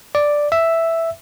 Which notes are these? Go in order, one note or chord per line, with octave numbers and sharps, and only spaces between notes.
D5
E5